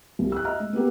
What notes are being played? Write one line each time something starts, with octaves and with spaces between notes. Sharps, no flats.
C2
E6 F#6
D#5 E5 A#5 F6
G#3
A#3 B3 G4 A#4